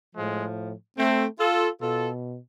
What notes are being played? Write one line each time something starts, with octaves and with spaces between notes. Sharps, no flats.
A2 F3 G#3
A3 C4
F4 A4
B2 F4 A4